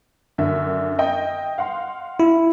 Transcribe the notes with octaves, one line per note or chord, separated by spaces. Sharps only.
F#2 D3 E5
D#5 G5
F5 F#5 C6
E4